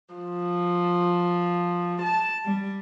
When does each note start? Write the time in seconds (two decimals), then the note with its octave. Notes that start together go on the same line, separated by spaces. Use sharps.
0.15 F3
2.04 A5
2.43 G3